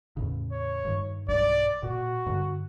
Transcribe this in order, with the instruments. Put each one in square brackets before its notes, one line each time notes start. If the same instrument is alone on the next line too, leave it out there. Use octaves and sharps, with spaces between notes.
[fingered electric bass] E2 A2 C#3
[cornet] C#5
[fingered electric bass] G2 D#3
[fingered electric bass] B1 G2 [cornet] D5
[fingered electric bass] A#2 [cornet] F#4
[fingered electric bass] G2 D3